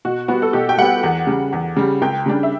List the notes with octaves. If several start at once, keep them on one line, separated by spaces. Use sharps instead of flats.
B2 F#4
G3 B3 F#4
A4
B2 G4
G5
G3 B3 F#5
E2
C#3 G3
E2
C#3 G3
C#2 G5
C#3 G3 D4 G4
E5